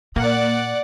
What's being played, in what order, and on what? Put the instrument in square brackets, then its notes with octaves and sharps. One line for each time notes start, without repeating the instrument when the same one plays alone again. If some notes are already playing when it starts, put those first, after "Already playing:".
[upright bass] A#2 [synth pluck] A#3 [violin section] D5 F#5